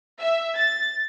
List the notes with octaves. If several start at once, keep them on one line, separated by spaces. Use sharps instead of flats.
E5
A6